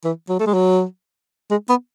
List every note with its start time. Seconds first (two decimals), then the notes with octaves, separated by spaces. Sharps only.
0.05 E3
0.29 F#3
0.40 A3
0.46 G#3
0.53 F#3
1.51 G#3
1.69 B3